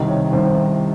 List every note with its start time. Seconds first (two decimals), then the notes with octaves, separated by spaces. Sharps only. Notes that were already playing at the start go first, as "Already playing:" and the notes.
Already playing: C2 C3 D#3 D#5
0.08 C#5
0.33 C2 C3 D#3 C5